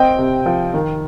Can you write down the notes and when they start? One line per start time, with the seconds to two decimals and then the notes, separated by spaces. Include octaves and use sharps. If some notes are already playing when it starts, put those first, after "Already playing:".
Already playing: C4 D#5 G5
0.18 C3
0.46 F3
0.74 D#3